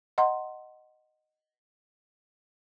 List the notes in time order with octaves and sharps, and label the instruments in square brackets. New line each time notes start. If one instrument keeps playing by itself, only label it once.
[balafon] D#5 F#5 A#5 C6